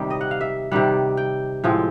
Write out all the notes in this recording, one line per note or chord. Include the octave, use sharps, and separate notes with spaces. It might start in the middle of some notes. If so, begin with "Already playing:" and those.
Already playing: C3 D#3 G3
D#5
F#5
F5
E5
C3 D#3 G3 F#5
G5
A2 F3 G#3 C4